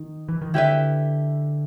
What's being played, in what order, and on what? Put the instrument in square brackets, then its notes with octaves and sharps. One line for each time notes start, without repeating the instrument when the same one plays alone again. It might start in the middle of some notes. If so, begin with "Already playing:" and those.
Already playing: [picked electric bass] D#3
E3
D#3
[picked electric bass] D3 [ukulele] E4 G4 B4 E5